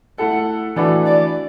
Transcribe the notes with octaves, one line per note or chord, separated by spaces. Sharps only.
A3 E4 A4 F#5
E3 A3 D4 F#4 B4 D5
D5